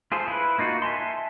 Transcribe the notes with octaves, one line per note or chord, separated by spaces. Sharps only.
F4 G#4 A4 C5
E4 B4
A#3 D#4 F4 F#4
E5 G#5 A5 C6